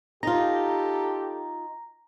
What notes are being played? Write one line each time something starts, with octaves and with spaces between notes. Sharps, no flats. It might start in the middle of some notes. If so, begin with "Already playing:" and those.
D#4 F4 G4 A4 A#5